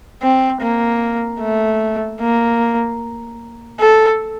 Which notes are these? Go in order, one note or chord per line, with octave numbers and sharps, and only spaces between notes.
C4
A#3
A3
A#3
A4